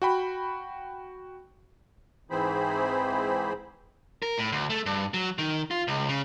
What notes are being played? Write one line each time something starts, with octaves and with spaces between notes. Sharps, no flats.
F#4 G5 B5
G#2 E3 C4 G#4 C5 B5
A#4
A2
D2
A3
G2
F#3
D#3
F4
C#2
C#3